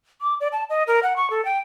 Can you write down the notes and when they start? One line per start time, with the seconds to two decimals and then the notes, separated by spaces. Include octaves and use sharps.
0.21 D6
0.41 D5
0.52 A5
0.70 D#5
0.87 A#4
1.03 F#5
1.17 C#6
1.30 A4
1.45 G5